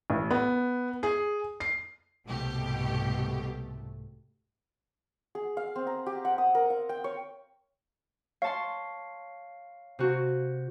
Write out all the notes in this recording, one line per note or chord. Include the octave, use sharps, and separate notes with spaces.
A1
B3
G#4
C7
C2 G#2 B2 A3 G4
G#4
F5
C4
A#5
G4
F#5
D#6
A#4
F5
G5
C#5
C#5 F5 A5 C6
C3 F#4